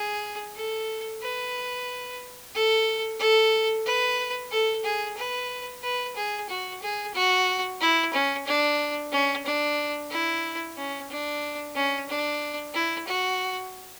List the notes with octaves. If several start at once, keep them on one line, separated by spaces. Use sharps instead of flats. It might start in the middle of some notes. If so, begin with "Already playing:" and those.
Already playing: G#4
A4
B4
A4
A4
B4
A4
G#4
B4
B4
G#4
F#4
G#4
F#4
E4
C#4
D4
C#4
D4
E4
C#4
D4
C#4
D4
E4
F#4